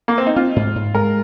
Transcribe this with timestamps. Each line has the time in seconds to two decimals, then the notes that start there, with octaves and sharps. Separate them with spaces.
0.08 A#3
0.18 C4
0.27 D#4
0.36 C4 F4
0.56 G#2
0.75 G#2
0.95 G#3 A#4